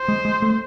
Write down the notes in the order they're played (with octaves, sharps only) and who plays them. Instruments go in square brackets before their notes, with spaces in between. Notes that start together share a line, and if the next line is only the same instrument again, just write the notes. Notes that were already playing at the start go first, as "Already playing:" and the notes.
Already playing: [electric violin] C5
[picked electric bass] G#3
G#3
A3